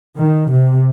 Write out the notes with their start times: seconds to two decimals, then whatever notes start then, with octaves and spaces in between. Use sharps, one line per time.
0.17 D#3
0.50 C3